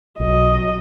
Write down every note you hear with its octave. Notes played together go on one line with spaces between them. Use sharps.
B1 F#3 D#5